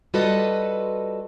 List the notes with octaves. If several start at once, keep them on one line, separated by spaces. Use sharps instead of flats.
G3 F4 F#4 A4 B4 D#5